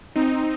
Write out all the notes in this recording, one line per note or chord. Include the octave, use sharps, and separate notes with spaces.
C4 D#4